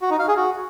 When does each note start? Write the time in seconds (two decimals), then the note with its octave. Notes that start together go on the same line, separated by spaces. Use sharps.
0.02 F#4
0.10 D#4
0.19 F5
0.28 G#4
0.37 F#4